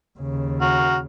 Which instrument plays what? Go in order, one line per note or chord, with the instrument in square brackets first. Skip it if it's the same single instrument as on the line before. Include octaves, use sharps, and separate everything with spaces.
[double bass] D#2 C#3
[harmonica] F#4 A#5 F6